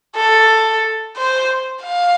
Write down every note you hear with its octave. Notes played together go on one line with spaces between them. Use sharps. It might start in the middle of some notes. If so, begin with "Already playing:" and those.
A4
C5
F5